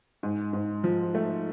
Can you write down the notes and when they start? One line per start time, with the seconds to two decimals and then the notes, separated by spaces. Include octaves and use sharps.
0.23 G#2
0.53 G#2
0.84 F3
1.15 A3